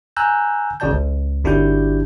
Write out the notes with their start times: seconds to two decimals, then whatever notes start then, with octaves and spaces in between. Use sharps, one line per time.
0.17 G#5 A#5 E6 F#6 G6
0.80 G#1 C#3 F#4 D5 A5 G6
0.91 C#2
1.44 G1 D4 E4 F#4 G4 G6